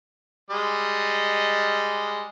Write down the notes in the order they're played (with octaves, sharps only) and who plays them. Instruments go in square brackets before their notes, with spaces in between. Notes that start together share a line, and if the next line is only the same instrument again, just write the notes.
[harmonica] G3 G#3 D#5